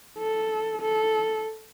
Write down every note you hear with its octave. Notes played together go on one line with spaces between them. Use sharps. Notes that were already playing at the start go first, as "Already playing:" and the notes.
A4
A4